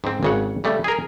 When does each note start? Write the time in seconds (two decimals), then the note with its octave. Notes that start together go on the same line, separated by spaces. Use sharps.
0.04 G#2 C4
0.23 G#1 C#3 F#5
0.64 C#3 G3 A3
0.84 G#4 A#4